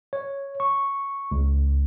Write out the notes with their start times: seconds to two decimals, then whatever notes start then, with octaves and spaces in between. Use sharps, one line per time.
0.13 C#5
0.60 C#6
1.31 C#2